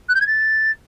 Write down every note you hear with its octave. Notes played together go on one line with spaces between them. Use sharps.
F#6
G6
G#6
A6